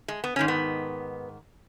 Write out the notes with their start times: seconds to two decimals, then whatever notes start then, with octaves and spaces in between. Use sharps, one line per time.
0.08 G#3
0.24 B3
0.36 G#2 D#3 C#4
0.48 B3